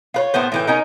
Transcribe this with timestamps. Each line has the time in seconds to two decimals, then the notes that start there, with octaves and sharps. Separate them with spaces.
0.14 F4 B4 C#5
0.34 A2 A3 B3 C5
0.52 A2 E3 G5
0.67 C#4 D#4 A#4